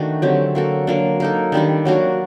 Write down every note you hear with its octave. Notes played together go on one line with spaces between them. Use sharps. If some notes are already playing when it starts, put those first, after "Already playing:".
Already playing: D#3 A3 D4 F#4
D3 F#3 C4 G4
A#3 F#4 A4
F#3 A#3 D4
A#3 D#4 A4
D#3 G3 D4 A4
F#3 A#3 D4 F#4